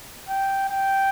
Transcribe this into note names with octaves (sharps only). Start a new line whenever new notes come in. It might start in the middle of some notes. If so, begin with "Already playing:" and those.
G5
G5